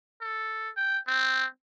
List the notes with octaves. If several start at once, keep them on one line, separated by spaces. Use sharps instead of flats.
A4
G5
C4